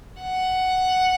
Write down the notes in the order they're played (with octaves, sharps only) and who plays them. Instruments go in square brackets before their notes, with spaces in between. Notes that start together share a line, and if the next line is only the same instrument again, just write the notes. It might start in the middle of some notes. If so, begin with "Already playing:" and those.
[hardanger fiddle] F#5